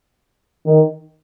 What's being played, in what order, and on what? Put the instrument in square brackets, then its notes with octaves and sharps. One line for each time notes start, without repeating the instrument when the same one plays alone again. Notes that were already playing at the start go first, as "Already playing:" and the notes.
[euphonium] D#3